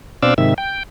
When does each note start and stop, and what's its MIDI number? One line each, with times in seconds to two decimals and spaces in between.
0.23 0.34 47
0.23 0.34 60
0.23 0.34 62
0.23 0.34 74
0.23 0.34 77
0.23 0.34 88
0.38 0.54 44
0.38 0.54 48
0.38 0.54 51
0.38 0.54 76
0.58 0.83 79